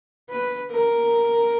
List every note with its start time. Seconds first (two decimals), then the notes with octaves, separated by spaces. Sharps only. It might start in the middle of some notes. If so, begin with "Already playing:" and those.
0.30 B4
0.71 A#4